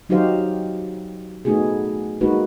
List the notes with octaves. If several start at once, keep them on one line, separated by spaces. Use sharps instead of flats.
F#3 D#4 F#4 G4 C5 F5
A3 B3 D#4 F#4 G#4
G#3 A#3 D#4 F#4 B4